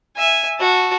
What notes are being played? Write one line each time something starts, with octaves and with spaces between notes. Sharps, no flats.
E5 G#5
F#4 A5